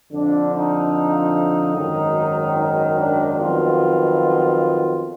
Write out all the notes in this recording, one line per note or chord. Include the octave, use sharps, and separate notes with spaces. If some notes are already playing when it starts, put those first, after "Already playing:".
F2 D3 F3 D4
D#4
G#1 F#2 D#3
D#4
D4
F2 D#3 F#3 B3 F4